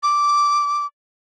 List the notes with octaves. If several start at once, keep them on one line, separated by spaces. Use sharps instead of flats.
D6